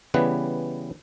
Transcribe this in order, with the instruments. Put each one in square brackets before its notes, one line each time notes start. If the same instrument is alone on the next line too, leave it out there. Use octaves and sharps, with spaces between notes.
[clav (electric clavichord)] C#3 E3 G3 B3 B4